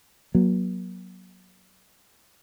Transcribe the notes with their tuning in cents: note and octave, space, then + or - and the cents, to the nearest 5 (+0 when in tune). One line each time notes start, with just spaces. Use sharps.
F#3 +0 A#3 +35